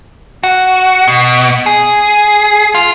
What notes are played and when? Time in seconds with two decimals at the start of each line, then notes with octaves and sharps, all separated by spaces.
0.44 F#4
1.08 B2
1.66 G#4
2.75 F4